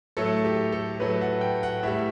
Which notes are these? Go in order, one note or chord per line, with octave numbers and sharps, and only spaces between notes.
A2 F#3 A3 A4
G4
A4
A2 F#3 A3 B4
F#5
G5
F#5
A2 G3 E5